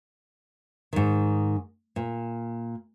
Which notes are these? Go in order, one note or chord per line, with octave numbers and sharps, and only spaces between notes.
G#2 D#3
A#2